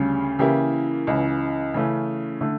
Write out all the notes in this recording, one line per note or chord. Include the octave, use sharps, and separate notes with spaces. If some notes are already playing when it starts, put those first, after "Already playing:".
Already playing: D2 C#3 G3 C#4
C#3 E3 A#3 E4 G4
C#2 C#3 E3
C#3 E3 A3 C#4
D3 A3